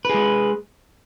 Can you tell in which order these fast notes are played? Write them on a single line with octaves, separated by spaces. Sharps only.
B4 G#4 G#3